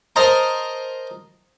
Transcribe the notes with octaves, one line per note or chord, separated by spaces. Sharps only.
A#4 C5 D#5 A5 A#5